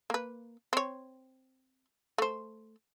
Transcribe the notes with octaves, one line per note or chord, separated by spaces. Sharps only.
A#3 B4
C4 C#5
A3 C5